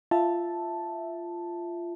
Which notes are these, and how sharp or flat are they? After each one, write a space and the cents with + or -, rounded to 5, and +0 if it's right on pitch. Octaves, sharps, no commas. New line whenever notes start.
F4 -15 E5 +0 A5 +0